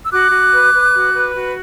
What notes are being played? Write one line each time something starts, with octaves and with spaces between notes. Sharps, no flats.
E6
F#4 D6 F#6
F#4
B4
B4
F#4
B4
F#4